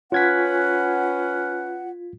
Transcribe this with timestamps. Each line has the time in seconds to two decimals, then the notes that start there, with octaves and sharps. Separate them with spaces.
0.12 C#4 F4 B4 F#5 G#6 B6